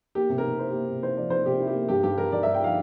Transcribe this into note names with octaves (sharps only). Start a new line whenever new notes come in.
A#3 G4
C3
A#4
C3
E4 C5
G4
A#3
C3
E4 C5
F3 D5
A#3 C5
C3 G4
E4
G4
A#3
G2 G4
G2 G4
D3 A#4
D3 D5
E5
G2
G5
F3 F5